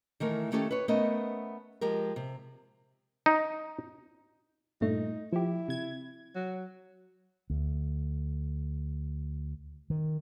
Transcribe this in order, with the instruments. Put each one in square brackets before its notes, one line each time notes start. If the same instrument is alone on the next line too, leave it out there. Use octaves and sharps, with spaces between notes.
[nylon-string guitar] D#3 E3 A3 A#4
D#3 A3 C#4 G4 A4
B4 C#5
A3 B3 C#4 A#4 C5 D#5
F3 G#3 G4 A#4
C3
[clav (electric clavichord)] D#4
[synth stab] G2 A#2 A3 [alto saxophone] D#4
[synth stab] F3 G4 [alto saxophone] E4
[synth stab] C3 G#6
[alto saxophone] F#3
[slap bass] D2
D#3